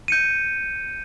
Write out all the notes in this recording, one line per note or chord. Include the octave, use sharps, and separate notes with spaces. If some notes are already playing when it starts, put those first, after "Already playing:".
G6 C#7 D#7